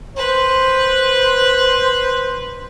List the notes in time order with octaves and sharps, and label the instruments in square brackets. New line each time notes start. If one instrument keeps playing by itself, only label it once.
[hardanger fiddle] B4 [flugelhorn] C5